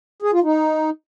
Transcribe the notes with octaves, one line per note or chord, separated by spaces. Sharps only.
G#4
F4
D#4